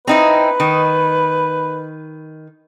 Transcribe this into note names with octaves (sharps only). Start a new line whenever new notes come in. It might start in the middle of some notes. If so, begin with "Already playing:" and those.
C4 D#4 E4 B4
D#3